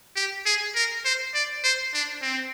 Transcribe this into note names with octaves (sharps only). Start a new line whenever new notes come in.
G4
G#4
A#4
C5
D5
C5
D4
C4